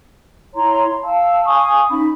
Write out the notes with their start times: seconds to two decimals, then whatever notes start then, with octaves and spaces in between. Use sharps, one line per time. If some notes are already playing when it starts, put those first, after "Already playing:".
0.54 E4 C#5 A#5 C6
1.03 F5 A5 E6
1.44 F5 G#5 C#6 D#6
1.90 C#4 D#4 B5